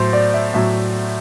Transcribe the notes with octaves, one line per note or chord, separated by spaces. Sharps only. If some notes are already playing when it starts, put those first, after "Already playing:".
Already playing: A2 F#3 C5
D5
E5
A2 F#3 E5